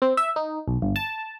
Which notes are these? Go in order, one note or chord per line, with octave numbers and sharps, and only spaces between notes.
C4
E5
D#4
B1
G1
A5